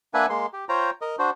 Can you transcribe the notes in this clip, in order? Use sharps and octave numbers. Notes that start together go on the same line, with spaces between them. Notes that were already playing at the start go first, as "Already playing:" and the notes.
A#3 D4 B4 E5 F#5 G#5
G#3 A#3 C6
G4
F4 C5 C#5 G5 A#5
A#4 D#5
D4 F#4 C5